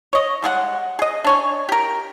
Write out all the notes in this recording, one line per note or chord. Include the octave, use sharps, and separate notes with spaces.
C#5 D#5
G3 G#3 G#4 F#5
G#4 D#5
D4 C#5 G#5
G4 A#4